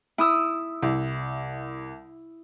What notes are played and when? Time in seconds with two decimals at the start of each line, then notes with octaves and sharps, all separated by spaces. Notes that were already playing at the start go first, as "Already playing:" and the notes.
0.18 E4 D#6 E6
0.83 C2